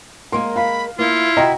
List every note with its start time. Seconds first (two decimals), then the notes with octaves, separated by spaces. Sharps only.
0.32 G#3 A#3 A#4 C6
0.56 F5 B5
0.99 A#3 E4 F4
1.37 C3 F#4 D#5 G5 A#5